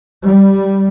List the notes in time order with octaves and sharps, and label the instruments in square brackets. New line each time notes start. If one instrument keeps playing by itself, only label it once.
[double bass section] G3